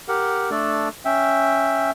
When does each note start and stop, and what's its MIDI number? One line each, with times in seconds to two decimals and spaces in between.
0.08 0.50 67
0.08 0.50 70
0.08 0.50 78
0.51 0.89 57
0.51 0.89 62
0.51 0.89 69
0.51 0.89 74
1.05 1.91 61
1.05 1.91 76
1.05 1.91 79